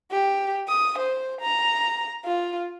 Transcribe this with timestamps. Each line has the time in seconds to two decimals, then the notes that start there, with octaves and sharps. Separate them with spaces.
0.12 G4
0.68 D#6
0.99 C5
1.41 A#5
2.25 F4